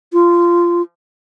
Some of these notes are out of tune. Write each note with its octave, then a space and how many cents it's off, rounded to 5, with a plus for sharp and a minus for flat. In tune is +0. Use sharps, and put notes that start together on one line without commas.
F4 -15